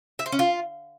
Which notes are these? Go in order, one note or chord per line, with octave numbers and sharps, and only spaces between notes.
E5
C5
C#4
F4